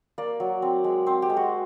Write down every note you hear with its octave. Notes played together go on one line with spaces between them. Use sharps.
A#3 D5
F#3
C4
G#3
C4 C5
G4
G#3
F#4